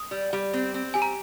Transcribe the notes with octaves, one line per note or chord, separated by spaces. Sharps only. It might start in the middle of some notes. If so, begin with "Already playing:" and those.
Already playing: D#6
G3
G3
C4
C4
G4 G#5
A#5